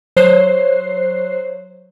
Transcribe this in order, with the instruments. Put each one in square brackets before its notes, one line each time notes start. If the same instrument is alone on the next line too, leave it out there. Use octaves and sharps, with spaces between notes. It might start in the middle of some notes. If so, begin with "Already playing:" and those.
[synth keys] F#3 C5 C#5 F#6 C7